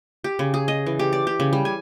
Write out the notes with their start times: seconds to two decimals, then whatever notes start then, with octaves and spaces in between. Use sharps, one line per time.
0.24 G4
0.39 C#3
0.54 G#4
0.68 D#5
0.86 E3
0.99 G4
1.13 D5
1.27 G4
1.40 C#3
1.53 G3
1.65 G#5